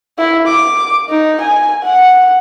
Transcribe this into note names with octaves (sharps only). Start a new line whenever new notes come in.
E4
D6
D#4
G#5
F#5